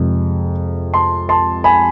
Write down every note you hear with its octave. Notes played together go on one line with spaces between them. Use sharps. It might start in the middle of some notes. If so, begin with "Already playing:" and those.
Already playing: F2 C3 G#3
A5 C6
A5 C6
G#5 B5